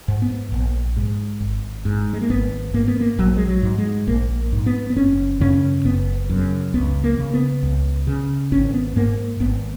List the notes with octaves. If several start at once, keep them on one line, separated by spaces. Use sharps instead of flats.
G#2
B3
A#1
G#2
G#1
G#2
G#3
A#3
G#1 B3
G#2 A#3
B3
A#3
A#1 F#3
G#3
F#3
G#2
G#3
A#1 A#3
G#2
B3
B3
F#1 C#4
F#2 C#3 C#4
F#1 B3
F#2 C#3
C#2 B3
A#3
C#3
B3
C#2
C#3
G#1 C#4
B3
G#2 A#3
G#1 B3